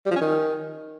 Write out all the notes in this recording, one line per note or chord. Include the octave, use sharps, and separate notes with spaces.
G3
F3
C#4
D#3